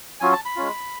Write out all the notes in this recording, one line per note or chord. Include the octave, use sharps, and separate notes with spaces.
F#3 C#4 F4 G#5
A5
B5
G#3 C#4 F4